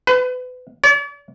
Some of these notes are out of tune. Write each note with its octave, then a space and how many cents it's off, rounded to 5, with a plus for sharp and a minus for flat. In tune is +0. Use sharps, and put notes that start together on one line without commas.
B4 +30
D5 -45